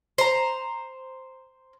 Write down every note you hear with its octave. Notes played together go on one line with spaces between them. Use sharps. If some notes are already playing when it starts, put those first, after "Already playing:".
C5 A#5